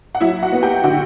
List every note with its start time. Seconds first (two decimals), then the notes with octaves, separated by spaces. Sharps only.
0.15 F#5
0.20 F#3 E4 E5
0.43 F#4 F#5
0.52 B3
0.62 G4 G5
0.83 D3 F#4 F#5